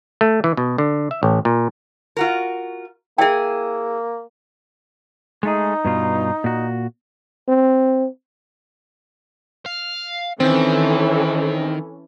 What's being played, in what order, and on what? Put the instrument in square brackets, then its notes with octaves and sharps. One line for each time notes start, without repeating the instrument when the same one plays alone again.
[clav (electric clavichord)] A3
E3
B2
D3
E5
A1
A#2
[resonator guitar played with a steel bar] F4 F#4 A#4
[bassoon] A#3 [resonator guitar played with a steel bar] E4 G#4 [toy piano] E5 G5
[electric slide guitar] G#3 A3 G#4 [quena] D#4
[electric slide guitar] G2 B2 F4
A#2 F#4
[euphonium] C4
[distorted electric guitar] F5
[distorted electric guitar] D#3 [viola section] E3 C#4 A4 [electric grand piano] C4